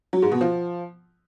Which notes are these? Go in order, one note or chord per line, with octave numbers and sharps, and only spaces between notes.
F#3
G#2
B2
F3